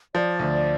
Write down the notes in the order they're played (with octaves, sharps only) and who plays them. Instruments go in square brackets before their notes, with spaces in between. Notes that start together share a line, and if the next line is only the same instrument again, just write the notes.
[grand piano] F3 [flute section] D5
[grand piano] D2